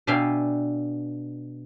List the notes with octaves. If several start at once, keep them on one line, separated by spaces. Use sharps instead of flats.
B2 D4 E5 F5 G5 G#5